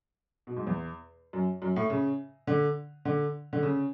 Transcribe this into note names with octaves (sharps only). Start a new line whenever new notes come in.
B2
G#2
E2
F#2
F#2
A2
C#3
D3
D3
D3
C#3